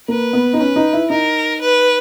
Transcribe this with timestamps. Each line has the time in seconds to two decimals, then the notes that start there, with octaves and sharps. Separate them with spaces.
0.08 A#3 B4
0.33 B3
0.53 D#4
0.59 C#4 B4
0.76 D#4
0.93 E4
1.10 D#4 A#4
1.61 B4